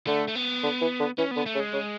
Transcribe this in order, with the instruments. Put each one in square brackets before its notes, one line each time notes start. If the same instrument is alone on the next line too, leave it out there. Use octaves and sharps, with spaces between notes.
[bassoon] D3 [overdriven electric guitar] A3
[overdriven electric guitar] A3
B3
[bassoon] D3
E3
D3
[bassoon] E3 [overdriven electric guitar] C#4
[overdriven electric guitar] B3
[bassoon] D3
[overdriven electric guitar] A3
[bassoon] C#3
[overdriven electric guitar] G#3
[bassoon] C#3